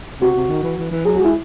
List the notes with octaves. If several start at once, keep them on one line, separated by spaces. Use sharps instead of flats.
C3 F#4
C3
D#3
E3
E3
E3
F#3 G#4
F#4
G#3 E4